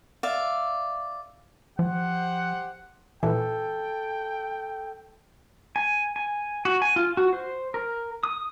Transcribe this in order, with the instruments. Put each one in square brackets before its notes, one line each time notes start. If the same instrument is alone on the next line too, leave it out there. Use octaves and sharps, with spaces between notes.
[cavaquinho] D5 E5 F5
[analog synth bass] F3 [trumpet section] G4 C5 F#5
[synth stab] A#2 E3 [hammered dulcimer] A4 [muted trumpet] G5
[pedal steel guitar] G#5
G#5
F#4
G#5
F4
F#4
C5
A#4
D#6